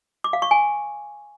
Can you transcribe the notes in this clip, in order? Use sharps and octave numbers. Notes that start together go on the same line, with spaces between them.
D6
F5
C#6
G#5